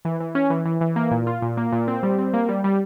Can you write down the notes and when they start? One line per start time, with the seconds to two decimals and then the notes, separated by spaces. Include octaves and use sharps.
0.05 E3
0.20 E3
0.35 C#4
0.50 E3
0.65 E3
0.81 E3
0.96 A#3
1.11 A#2
1.27 F4
1.42 A#2
1.57 A#3
1.72 A#2
1.88 C4
2.03 G3
2.19 C4
2.34 A#3
2.49 G3
2.64 G3